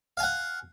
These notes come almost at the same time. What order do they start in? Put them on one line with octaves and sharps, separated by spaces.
F5 G#5 F#5